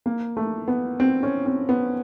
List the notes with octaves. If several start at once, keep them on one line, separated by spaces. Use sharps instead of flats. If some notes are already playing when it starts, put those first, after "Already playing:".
A#3
A3
B3
C4
C#4
C4
B3